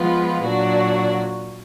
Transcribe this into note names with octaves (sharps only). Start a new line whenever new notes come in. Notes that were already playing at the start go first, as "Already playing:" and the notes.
Already playing: F3 G#3 B3 F4
A#2 F#3 D4 F#4